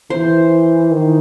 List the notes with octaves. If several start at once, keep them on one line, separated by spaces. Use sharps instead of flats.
E3 C5
D#3